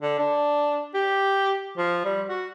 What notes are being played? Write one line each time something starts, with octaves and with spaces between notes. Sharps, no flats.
D3
D4
G4
F3
G3
F#4